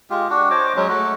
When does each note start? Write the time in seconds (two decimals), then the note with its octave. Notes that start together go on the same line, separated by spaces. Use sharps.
0.10 G#3 F4 G4
0.30 D4 F#4
0.51 C5 C#5 D#5 D6
0.76 F#3 G#3 C#4
0.89 A3 F#4